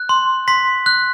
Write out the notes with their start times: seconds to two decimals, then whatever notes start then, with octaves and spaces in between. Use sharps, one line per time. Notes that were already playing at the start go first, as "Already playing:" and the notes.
Already playing: F#6
0.09 C6
0.48 C6 B6
0.86 F#6